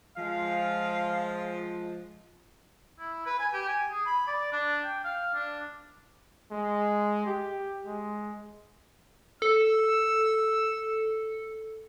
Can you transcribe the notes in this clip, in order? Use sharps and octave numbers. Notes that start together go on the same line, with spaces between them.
F3 G#3 F5
E4
B4
G#5
G4
G#5
G#4
B5
D5
D4
G5
F5
D4
G#3
G4
G#3
A4 E6